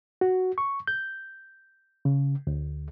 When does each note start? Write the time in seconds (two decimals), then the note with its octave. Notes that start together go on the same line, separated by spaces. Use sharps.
0.21 F#4
0.58 C#6
0.87 G6
2.05 C#3
2.47 D2